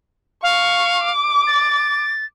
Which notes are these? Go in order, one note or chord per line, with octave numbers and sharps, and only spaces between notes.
F5 C#6
D6
A6